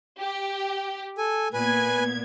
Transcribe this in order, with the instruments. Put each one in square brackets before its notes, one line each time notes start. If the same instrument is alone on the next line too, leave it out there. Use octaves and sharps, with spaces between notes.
[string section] G4
[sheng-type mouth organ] A4 G#5
[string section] A#2 B3 G#6 [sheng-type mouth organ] B4 G#5